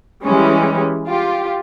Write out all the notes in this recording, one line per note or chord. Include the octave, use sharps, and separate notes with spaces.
E3 G3 G#3 C#4
F4 G4